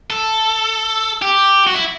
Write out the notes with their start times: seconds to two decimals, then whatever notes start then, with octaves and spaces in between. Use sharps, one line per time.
0.10 A4
1.22 G4
1.67 F#4
1.75 E4